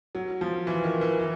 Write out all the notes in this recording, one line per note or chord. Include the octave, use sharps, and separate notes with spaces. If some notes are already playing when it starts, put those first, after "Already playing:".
F#3
F3
E3
D#3
E3
E3